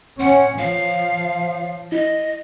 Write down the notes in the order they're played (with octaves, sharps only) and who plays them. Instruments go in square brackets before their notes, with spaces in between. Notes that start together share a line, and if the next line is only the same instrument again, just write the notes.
[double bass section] C#4 [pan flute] F#5 [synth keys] C6
[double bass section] F3 [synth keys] C#5 [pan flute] F5
[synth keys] E4 [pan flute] D#5